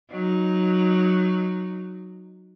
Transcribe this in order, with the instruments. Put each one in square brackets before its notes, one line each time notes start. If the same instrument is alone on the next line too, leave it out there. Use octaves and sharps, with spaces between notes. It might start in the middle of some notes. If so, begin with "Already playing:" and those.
[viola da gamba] F#3 D#4